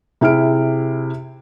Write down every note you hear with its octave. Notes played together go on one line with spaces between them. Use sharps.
C3 E4 G#4 F6 D7